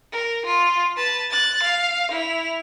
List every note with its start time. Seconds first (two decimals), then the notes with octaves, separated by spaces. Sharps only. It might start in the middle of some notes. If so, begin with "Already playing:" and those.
0.13 A#4
0.46 F4
0.97 B4 A5
1.31 F#6 A6
1.63 F5
2.11 E4 F7